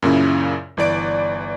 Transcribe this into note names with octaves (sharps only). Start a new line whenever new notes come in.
F#2 A#2 C#3 E4
G1 E3 D5 D7